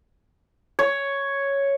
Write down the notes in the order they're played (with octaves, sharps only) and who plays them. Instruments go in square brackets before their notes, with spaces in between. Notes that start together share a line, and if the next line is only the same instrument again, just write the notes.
[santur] C#5